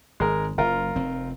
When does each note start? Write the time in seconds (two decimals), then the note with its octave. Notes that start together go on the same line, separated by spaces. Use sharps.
0.20 G#1 G#3 A#4
0.58 F#1 F4 A#4
0.96 F1 C4